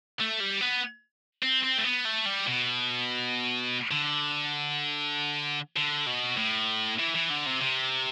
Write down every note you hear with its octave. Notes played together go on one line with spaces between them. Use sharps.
A3
G3
B3
C4
C4
A3
B3
A3
G3
B2
D3
D3
B2
A2
E3
E3
D3
C3
C3